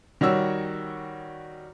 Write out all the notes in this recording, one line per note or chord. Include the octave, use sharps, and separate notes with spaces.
D#3 G3 F#4 C#5 E6